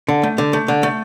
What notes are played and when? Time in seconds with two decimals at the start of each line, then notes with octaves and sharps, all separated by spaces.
0.08 D3
0.23 A3
0.38 D3
0.53 A3
0.68 D3
0.83 A3